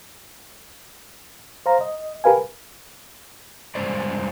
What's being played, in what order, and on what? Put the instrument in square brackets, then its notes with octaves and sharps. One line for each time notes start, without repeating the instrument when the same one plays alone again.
[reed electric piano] C5 F5 A#5
D#5
G4 A#4 B4 F5 G#5
[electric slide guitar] G2 G#3 C5 D5